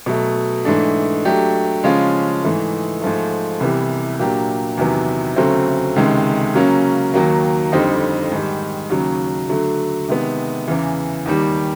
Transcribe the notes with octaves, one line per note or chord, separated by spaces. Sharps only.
B2 F#3 A3
G#2 E3 A3 D4
F#3 A3 D4 G4
C#3 F3 G#3 C#4 F4
G#2 E3 A3
G#2 F3 A3
C2 C3 E3 G3 B3
A#2 F#3 A#3 D4 G4
E2 C3 D#3 F#3 B3
D2 C#3 F#3 A3 C4
C#2 C3 D#3 G#3
C#3 F#3 A#3 C#4
D#2 D#3 F#3 A#3
F2 D3 G3 C4 D#4
G#2 D#3 G3
D#2 C#3 F#3
D3 F#3 A3
C3 D#3 G#3 B3
E2 C#3 E3
D#2 D#3 G3